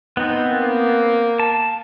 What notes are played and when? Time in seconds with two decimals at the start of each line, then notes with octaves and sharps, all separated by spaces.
0.17 B3 C4 D#4
0.49 A#3
1.40 A5